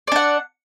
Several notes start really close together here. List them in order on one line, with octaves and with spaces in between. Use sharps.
D5 D4 F#5